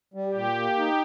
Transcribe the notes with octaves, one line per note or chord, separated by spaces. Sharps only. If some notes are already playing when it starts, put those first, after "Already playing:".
G3
G4
A#2
A#3
D#4